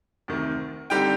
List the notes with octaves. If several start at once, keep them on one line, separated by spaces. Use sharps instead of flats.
D2 C3 D#3
D3 G3 C4 D#4 G4 G5